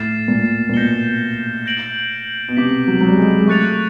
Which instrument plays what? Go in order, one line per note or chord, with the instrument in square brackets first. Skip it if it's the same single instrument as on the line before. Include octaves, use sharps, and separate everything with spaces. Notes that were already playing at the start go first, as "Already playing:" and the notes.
Already playing: [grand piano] A2 [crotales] F6 A6 C7 E7
[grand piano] A#2
A#2
[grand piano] B2 [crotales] G6 A#6 C#7 E7 G7
[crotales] G6 A#6 D7 F#7
[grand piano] B2
[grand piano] C3 [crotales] D6 G6 B6
[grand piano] F#3
F#3
G3
G#3
G#3
[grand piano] A3 [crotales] C#6 F#6 A6 C#7 F7